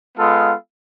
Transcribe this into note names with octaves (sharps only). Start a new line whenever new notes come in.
G#3 B3 F4 A4 F5